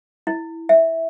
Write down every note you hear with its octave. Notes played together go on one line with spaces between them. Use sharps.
E4
E5